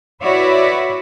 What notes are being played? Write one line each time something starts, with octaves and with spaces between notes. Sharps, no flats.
E4 F#4 B4 C#5 D5 E5